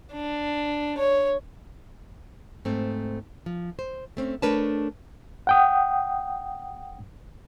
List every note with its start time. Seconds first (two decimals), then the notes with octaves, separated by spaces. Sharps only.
0.13 D4
0.98 C#5
2.65 G#2 A3 C4
3.46 F3
3.79 C5
4.17 A3 C4 C#4
4.42 A3 D4 A#4 B4 C#5 A5
5.47 F#5 G5 D#6